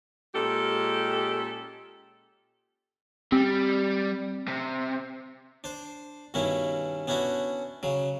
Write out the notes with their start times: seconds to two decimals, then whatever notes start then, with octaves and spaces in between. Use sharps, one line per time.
0.35 A#2 G#3 C#4 G4 A4
3.32 G3 C4
4.48 C3
5.64 D4 C5
6.34 G2 B2 D#3 C#4 E4
7.08 B3 C#4 D4 E4 F#4
7.83 C#3 F#3